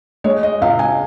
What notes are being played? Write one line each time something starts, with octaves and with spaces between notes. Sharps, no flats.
G#3 C#5
D#5
C#2 F5
G#5